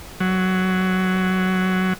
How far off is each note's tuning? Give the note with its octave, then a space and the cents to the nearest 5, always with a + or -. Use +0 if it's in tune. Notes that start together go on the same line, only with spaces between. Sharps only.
F#3 +10